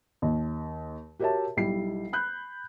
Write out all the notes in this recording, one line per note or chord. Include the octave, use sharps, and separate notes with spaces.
D#2
F#4 G4 A#4 C#5 E5 A5
B1 G3 E4 C7
B5 F#6 G6